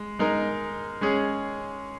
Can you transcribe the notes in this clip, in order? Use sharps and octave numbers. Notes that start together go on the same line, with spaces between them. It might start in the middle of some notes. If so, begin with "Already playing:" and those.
Already playing: G#3
G#3 D#4 A#4
G#3 C#4 G#4